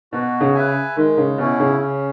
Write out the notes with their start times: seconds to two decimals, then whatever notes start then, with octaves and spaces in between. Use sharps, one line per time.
0.12 B2 F#4
0.41 C#3
0.54 B4 E5 G#5
0.96 D#3 G#3
1.17 C#3
1.38 B2 C#4 E4
1.60 C#3
1.80 C#4